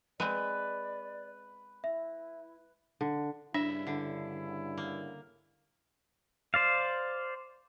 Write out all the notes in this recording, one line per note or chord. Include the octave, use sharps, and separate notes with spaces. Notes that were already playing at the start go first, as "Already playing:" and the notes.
G#3 B3 C4 B4 D5
E4 E5
D3
G2 C#3 D4 E4 E5
D3
A#3
C5 D5 F5